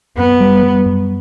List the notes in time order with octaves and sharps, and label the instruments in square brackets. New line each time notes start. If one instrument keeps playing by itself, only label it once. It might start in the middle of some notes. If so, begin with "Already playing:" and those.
[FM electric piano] F#2 [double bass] B3
[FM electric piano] G3
G3
F#2